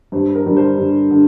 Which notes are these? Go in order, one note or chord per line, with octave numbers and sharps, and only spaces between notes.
G2 C5
A#4
D3 G3
C5
G2
D3